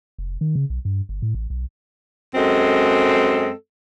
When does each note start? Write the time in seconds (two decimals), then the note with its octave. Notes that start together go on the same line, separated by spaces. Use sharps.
0.18 F1
0.41 D#3
0.55 C#3
0.70 B1
0.85 G2
1.09 G1
1.22 A2
1.35 A1
1.50 B1
2.35 F#2 G#3 C4 A4 D#5